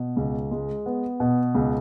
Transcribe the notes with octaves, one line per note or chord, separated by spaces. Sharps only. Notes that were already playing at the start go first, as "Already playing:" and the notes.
Already playing: B2
C#2
G#3
B3
B2
C#2